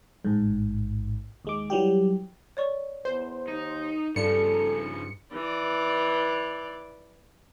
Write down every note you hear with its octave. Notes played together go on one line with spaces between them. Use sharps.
A1 G#2
D#2 G#3 D6
E3 F#3 G3 G4
C#5 D5 C#6
E2 C5
D#2 D#4
G2 C#3 F3 A4 D5 C#7
A#5
E3 D5